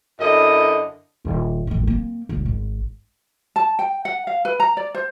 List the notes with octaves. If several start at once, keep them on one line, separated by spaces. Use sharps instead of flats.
F#2 D3 E4 D#5
D#1
A1 F2
A#3 C4
D#1 C#2
G#1
A5
G5
F#5
F5
B4
A#5
D5
C5